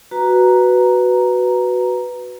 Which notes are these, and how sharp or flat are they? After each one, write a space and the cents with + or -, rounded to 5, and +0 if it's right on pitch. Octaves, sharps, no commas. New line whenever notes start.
F#4 +0 B4 +0 A#5 +0